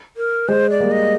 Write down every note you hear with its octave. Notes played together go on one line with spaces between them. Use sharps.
A#4
G#3 C5
D5
G3 A#3
D#5